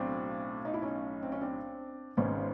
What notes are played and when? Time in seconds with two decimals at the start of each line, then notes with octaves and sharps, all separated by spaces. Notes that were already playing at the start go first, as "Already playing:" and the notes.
Already playing: B1 A2 F#3 C4 D4
0.65 D#4
0.74 E4
0.82 C#4 D#4
1.22 C4
1.32 C#4
1.41 C4 D4
2.17 G#1 G#2 D#3 B3 C#4